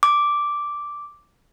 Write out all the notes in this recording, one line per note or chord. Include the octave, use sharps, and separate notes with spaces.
D6